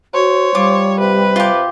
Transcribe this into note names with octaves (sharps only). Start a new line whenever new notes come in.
F#4 C5 C#5
G3 F4 D6
C3 B4
F4 G4